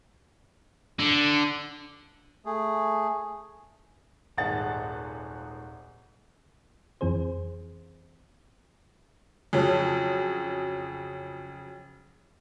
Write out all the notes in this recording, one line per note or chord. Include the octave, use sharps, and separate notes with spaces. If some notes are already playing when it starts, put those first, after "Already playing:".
D3
A3 G#4
D#1 G#1 G#4 D#5 F#5 A6
F2 E3 C4 G#4 C5
F2 C#3 F#3